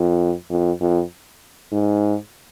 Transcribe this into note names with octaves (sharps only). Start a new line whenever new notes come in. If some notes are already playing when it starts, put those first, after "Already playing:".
Already playing: F2
F2
F2
G#2